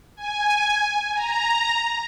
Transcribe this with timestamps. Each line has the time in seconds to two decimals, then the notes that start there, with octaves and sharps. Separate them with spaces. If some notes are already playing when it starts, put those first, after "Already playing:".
0.16 G#5
1.14 A#5